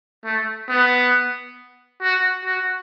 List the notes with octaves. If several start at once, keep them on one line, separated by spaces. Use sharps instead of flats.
A3
B3
F#4
F#4